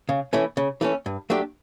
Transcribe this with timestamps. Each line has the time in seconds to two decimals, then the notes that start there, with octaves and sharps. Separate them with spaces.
0.09 C#3
0.33 E3 A3 C#4
0.57 C#3
0.81 E3 A3 C#4
1.06 G2
1.30 F#3 A3 D4 G4